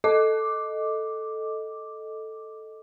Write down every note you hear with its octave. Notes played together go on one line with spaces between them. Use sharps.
A4 D#5 D6